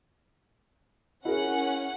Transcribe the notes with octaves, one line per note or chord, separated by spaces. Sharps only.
C#4 E4 G#4 A#4 F#5